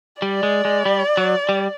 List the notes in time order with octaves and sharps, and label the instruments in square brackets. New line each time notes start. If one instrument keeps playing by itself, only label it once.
[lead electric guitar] G3 [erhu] D5
[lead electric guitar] G#3
G#3
G3
F#3
G3